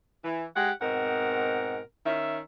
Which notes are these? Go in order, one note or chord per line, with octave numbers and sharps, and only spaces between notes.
E3
G#3 G4 F#5
G#2 B2 C4 A#4 F#5
D#3 C#4 E5